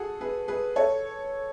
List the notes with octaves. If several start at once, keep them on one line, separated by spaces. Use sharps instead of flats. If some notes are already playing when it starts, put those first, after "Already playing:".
Already playing: F#4 G#4 A4
G#4 B4
G#4 B4
A4 C#5